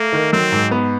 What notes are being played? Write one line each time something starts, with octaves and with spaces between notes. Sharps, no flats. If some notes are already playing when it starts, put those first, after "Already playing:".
Already playing: A3 A#3
D#3
F#3 C4
G#2
B3